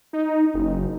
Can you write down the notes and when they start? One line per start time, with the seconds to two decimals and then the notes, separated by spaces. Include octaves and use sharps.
0.13 D#4
0.54 F#1